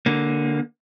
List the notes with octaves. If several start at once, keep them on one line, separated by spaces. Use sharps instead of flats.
D3 A#3